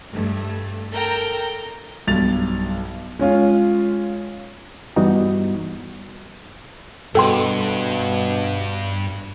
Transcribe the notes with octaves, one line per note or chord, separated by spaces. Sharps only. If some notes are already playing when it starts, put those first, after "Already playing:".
G2 A3
A4 A#4 G5 A#5
B1 G2 A6 F7
G#3 C#4 F4
G2 E3 G3 B3 D#4 F#4
G2 B2 A4 G5 C6